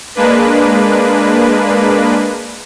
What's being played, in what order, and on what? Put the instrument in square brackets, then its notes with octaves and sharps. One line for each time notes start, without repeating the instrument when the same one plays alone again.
[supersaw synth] G#3 A#3 D4 B4